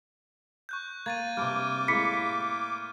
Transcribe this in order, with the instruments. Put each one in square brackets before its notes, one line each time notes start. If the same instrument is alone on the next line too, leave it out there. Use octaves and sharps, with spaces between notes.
[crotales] C#6 F#6 G6
[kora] A#3 [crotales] G#6 A6 D#7
[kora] G2 C3 [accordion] D6 [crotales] F6
[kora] A2 G#3 A#3 [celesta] B5 B6 C#7